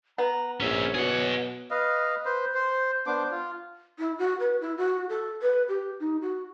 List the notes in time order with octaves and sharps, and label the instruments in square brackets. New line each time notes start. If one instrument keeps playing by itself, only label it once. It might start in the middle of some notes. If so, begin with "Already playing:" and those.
[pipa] B3 [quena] A#5
[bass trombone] A#1 [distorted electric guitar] C#4 E5 [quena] C#5
[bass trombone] B2 [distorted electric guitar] G#4 F#5
[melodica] B4 D#5 F5
B4 C5
C5
B3 D4 C5 D6
F4
[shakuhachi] E4
F#4
B4
E4
F#4
A4
B4
G4
D#4
F#4